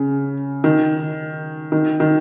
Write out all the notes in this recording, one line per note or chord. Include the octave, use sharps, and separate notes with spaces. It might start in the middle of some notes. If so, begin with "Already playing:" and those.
Already playing: C#3
D#3
D#3
D#3